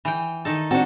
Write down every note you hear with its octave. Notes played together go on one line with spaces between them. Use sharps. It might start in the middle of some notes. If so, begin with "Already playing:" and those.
E3 G5
D#3 D#4 A4
C4 D4 F#4 A4